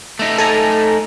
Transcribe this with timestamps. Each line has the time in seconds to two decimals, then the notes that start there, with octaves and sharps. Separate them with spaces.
0.19 A3 D#4
0.38 A4 G#5 A#5